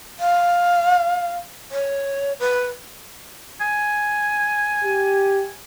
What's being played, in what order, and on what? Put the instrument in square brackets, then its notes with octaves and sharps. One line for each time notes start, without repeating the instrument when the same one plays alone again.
[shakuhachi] F5
C#5
B4
[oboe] G#5
[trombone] G4